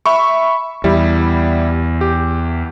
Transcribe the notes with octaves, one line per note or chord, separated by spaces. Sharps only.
E5 B5 C#6
E2 G3 E4
G4